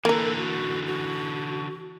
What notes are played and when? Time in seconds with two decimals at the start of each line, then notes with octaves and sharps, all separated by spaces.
0.05 D3 E3 A#3 A4 A#4
0.36 F#4
0.86 F#4